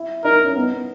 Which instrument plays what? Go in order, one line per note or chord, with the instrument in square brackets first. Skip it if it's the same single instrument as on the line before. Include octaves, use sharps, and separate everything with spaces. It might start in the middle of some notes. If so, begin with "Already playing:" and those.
Already playing: [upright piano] E4
[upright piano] D#4 [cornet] A#4
[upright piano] C#4
B3